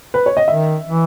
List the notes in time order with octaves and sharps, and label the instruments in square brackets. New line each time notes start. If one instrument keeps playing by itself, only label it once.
[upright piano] B4
C#5
D#5
[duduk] D#3 [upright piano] E5
[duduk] E3